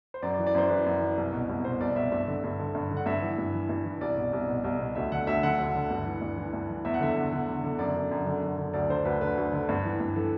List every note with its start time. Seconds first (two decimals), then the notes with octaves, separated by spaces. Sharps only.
0.14 C5
0.22 F#2 D5
0.34 D5
0.38 E3
0.47 D5
0.55 F#2 C5
0.69 E3 B4
0.86 F#2
1.02 E3
1.18 C2
1.33 B2
1.49 C2
1.65 B2 C5
1.80 C2 D5
1.96 B2 E5
2.12 G2 E5
2.27 D3
2.44 G2
2.59 D3
2.75 G2
2.91 D3
2.97 F#5
3.06 G2 E5
3.22 E3
3.38 G2
3.54 E3
3.69 G2
3.85 E3
4.01 C2 D5
4.17 B2
4.33 C2
4.49 B2
4.64 C2
4.79 B2
4.95 D2 E5
5.12 D3 F#5
5.27 D2 E5
5.43 D3 F#5
5.59 D2
5.75 D3
5.90 G2
6.06 E3
6.21 G2
6.37 E3
6.53 G2
6.69 E3
6.85 E2 E5
6.94 F#5
7.00 D3 E5
7.16 E2
7.32 D3
7.49 E2
7.63 D3
7.79 F#2 D5
7.95 D3
8.11 F#2
8.27 D3
8.43 F#2
8.58 D3
8.74 D2 D5
8.89 D3 C5
9.05 D2 B4
9.21 D3 B4
9.37 D2
9.53 D3
9.69 G2
9.85 E3
10.00 G2
10.16 E3 A4